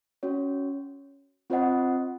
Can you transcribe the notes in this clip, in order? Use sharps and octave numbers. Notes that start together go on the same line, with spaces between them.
C#4 F#4 C#5
C4 F4 C5 D#5 F#5